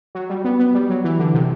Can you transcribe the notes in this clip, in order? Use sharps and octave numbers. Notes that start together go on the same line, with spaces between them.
F#3
G3
B3
B3
G3
F#3
E3
D3
C3